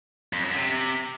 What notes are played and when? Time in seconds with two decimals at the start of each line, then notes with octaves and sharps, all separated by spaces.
0.33 F2
0.45 F#2
0.56 C3